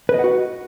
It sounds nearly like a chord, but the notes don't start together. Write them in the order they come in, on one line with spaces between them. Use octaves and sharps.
B4 D#5 F#5 F#4